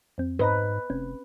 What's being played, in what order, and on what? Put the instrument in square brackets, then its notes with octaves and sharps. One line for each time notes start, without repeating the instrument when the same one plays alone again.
[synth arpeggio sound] F2 C4
[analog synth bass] G#2 [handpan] B4 [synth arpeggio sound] C5 D#5 A#5
[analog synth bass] F1 [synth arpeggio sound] C4 C#4